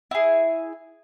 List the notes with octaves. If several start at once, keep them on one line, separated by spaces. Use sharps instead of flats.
E4 G#4